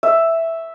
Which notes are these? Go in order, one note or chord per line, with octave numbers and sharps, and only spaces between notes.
E5